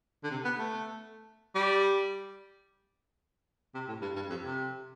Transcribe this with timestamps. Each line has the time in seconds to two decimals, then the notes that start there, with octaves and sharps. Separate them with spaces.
0.24 D3
0.31 C3
0.45 B3
0.59 A3
1.55 G3
3.75 C3
3.88 A2
4.02 G2
4.16 G2
4.30 F2
4.44 C3